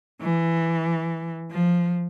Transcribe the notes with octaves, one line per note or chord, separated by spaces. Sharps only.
E3
F3